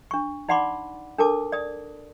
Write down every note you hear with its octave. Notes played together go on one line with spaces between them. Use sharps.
D4 C#6
D#4 D5 F#5 B5 C6 D6
D4 A4 A#4 A5 D6
D5 D#6